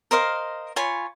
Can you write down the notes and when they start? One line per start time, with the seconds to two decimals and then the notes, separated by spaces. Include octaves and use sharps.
0.11 A#4 C5 D#5 F5
0.76 F4 C#5 G#5 B5